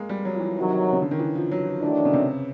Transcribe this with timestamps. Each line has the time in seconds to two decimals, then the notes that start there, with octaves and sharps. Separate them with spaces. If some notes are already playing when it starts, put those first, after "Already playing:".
Already playing: G#3 A#3
0.09 G3
0.25 F#3
0.34 F3
0.40 E3
0.56 C3 D#3 F#3
0.93 C#3
1.02 D3
1.11 D#3
1.19 E3
1.36 F3
1.51 F#3
1.66 F3
1.82 D#3 E3 F#3 A3 D4
2.05 C#3
2.14 C3